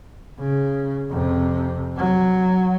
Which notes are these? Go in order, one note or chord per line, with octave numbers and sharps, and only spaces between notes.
C#3
F2 C3
F#3